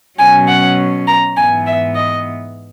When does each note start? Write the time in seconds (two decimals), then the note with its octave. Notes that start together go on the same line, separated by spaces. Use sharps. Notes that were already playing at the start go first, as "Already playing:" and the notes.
0.19 B2 F#3 C#4 G#5
0.48 F#5
1.07 A#5
1.36 G#2 E3 B3 G#5
1.66 E5
1.95 D#5